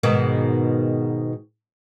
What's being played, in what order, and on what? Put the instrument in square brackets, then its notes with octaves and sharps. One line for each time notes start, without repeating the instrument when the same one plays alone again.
[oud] G#2 B2 D#3